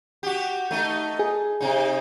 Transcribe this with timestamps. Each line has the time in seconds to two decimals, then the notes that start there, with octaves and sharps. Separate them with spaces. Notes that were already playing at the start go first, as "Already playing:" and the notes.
0.23 F#4 G4
0.71 A3 D#4
1.19 G#4
1.61 C3 D#4